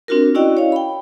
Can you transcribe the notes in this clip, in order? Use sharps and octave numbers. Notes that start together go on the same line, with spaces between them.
C4 D4 F4 F#4 A#4
C#4 E4 F#4 D5 D#5 G5
C#5 F5
G5 B5